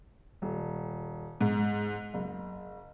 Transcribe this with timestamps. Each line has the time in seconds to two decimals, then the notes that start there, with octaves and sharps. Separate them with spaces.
0.42 D#1
1.41 G#2
2.14 F#1